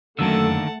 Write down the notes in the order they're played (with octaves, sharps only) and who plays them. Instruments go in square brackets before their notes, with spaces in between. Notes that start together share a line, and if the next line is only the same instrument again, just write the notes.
[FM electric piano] F#2 E6 [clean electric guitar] D3 D#3 A#3 [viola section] A3 [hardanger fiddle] F#5 A5